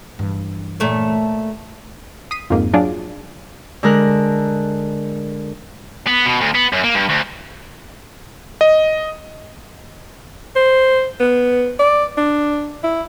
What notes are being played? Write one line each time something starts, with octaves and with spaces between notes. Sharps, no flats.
G2 E3
A#2 A3 C#5
D#6 B6 C7 D#7
F2 G#2 A#3
F#3 D4 F4 G#4 D5
D3 G#3 A#4 F#6
B3
B2
D2
B3
F#2
A#3
G2
D2
D#5
C5
B3
D5
D4
E4